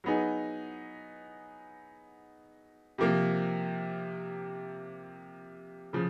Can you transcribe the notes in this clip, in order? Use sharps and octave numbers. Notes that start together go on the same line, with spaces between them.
F#3 B3 D#4 G#4
C3 F3 A#3
C#3 F3